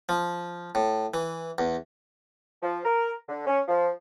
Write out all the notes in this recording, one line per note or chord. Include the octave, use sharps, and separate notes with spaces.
F3
A2
E3
E2
F3
A#4
D3
C#4
F3